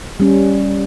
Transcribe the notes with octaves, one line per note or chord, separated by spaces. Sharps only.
G3 C#4